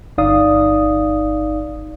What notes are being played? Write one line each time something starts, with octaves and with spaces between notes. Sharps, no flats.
G1 D#4 D5 F5 D#6